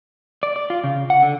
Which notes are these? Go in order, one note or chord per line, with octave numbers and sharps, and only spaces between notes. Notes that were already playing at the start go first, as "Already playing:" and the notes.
D5
D5
F4
C#3
F#5
D3